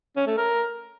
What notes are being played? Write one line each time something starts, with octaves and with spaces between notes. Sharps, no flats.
C#4
A3
A#4